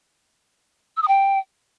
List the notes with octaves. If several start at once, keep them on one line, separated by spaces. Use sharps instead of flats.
E6
D#6
G5